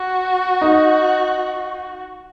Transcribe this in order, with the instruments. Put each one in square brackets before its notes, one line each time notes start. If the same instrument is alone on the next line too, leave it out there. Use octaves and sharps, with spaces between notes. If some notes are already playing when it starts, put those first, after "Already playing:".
Already playing: [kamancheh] F#4
[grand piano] D#4